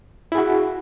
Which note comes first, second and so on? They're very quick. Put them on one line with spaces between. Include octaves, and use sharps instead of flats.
E4 G#4 F#4